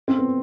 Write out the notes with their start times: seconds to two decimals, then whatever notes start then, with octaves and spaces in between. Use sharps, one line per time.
0.08 C4
0.19 B3